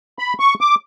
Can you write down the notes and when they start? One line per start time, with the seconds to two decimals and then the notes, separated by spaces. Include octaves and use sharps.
0.19 B5
0.40 C#6
0.61 D6